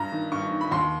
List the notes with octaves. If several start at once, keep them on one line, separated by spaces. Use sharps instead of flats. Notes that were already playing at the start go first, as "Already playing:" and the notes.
Already playing: G2 A#5
D#3
G2 C#6
D#3
B5
D#2 C6